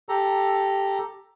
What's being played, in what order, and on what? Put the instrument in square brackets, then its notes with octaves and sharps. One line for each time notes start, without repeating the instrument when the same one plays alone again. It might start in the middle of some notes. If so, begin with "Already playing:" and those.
[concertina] G4 A4 A#5